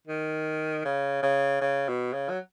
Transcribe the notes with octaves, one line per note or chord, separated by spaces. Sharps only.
D#3
C#3
C#3
C#3
B2
C#3
F#3